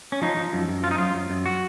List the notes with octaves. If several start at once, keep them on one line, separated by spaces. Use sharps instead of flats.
C#4
F3 D#4
F3
F#2
F#2
F3 F4
D#4
F#2 F4
F#2
F#2
F#4